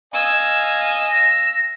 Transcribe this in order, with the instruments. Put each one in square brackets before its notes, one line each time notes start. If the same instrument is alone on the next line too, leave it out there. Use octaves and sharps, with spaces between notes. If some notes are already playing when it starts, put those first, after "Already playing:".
[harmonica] D#5 F5 G#5 [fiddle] E6 [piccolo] G#6
[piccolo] A#6